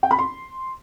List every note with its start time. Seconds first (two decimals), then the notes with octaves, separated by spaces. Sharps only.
0.03 G5
0.11 B5
0.19 C6